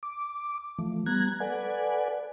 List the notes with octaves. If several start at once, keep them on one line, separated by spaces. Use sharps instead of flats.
D6
E3 F3 A3
G3 B3 A#5 F#6 G#6
A4 B4 D5 F#5 G#5